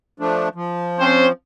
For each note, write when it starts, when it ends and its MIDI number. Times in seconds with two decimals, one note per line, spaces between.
0.20 0.49 53
0.20 0.49 57
0.20 0.49 62
0.55 1.32 53
1.00 1.27 60
1.00 1.27 61
1.00 1.27 72